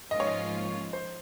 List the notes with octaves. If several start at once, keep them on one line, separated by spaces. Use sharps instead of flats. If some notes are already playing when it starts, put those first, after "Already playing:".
G#2 F3 A#3 C#4 F4 D#5
C#5
D#5
C5